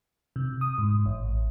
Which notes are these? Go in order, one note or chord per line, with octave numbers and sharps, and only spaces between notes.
C3
D#6
G#2
A1